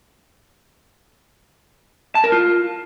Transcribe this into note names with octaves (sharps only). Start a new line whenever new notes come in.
A5
A#4
F4